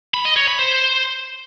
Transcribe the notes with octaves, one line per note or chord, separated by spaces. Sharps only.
B5
D#5
C#5
B5
C5